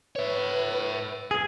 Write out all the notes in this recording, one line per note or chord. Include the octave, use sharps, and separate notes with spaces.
B4 C#5 E5
G#4